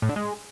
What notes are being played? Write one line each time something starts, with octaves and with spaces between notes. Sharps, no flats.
A2
D3
G#3